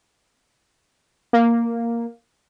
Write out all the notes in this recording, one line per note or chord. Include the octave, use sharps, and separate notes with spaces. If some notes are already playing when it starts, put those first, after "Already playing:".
A#3